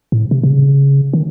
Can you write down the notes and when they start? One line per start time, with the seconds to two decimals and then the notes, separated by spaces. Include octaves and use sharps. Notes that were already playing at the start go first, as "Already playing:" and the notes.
0.12 A2
0.31 C3
0.43 C3
0.49 C#3
1.13 D#3